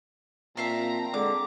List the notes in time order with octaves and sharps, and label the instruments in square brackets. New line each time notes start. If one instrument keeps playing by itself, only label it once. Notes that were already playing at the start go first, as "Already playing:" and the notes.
[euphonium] A#2 [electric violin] C4 A#5 [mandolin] E5 F5 A5
[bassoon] D3 [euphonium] G#3 [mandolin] D6